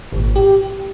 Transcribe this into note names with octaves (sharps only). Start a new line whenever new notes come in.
G#1 A#2
G4